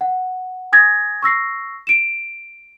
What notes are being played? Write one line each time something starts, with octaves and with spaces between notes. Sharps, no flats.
F#5
G#5 D#6 G#6 A#6
C#6 E6 A#6 C7
D7 E7